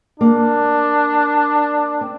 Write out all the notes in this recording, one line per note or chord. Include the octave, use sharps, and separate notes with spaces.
A#3 D4
C4